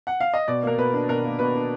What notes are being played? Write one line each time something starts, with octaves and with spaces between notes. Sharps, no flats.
F#5
F5
D#5
B2 D5
A#3 A#4
B2 B4
D4
B2 A#4
A#3
B2 B4
D4